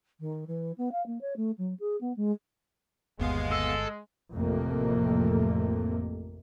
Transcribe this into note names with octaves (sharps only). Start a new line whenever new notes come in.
D#3
E3
B3
F5
A#3
C#5
A3
F#3
G#4
B3
G#3
G1 D#2 G#3 B3 F5
A4
A1 F2 C3 A3 A#3